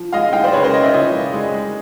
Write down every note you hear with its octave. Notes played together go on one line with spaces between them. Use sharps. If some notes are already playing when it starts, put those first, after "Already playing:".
Already playing: F3
G#3 D#5 F5
G#3 F5 G5
C5 D5
C#3 B4 C#5
A#4 C5
C#3 C#5 D#5
D5 E5
F3 C#5 D#5
G#3
G#3
G#3